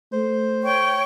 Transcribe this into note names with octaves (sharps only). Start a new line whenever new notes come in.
A3 C5
C#5 G5 C#6